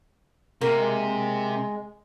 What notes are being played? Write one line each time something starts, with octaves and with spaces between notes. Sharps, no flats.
C3 A#3
G#3